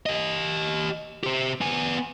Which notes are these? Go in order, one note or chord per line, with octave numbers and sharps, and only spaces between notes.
G4 D#5
G4 C5
B3 G#5